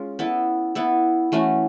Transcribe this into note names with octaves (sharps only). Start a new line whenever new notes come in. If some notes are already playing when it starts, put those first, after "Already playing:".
Already playing: G#3 C#4 F4
B3 E4 A4
B3 E4 A4
E3 A3 C#4 F#4